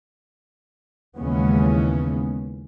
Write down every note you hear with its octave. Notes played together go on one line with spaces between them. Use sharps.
D#2 C#3 E3 G#3 B3 C#4